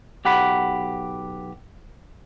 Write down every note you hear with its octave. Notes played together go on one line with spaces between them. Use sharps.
B1 G4 F#5 B5